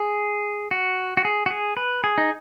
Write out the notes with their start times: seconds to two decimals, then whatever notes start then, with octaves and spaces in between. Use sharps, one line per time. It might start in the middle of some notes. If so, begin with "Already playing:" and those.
Already playing: G#4
0.71 F#4
1.17 F#4
1.25 G#4
1.46 F#4
1.50 G#4
1.77 B4
2.04 G#4
2.18 D#4